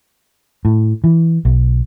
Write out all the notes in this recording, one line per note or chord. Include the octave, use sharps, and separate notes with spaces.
A2
E3
B1